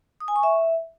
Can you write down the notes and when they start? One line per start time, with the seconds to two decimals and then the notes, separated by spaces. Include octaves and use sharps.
0.20 D#6
0.28 G#5
0.36 C#6
0.43 E5